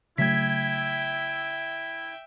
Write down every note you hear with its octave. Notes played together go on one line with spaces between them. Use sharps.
C#3 F#3 A3 E4 E5 G5 G#6 B6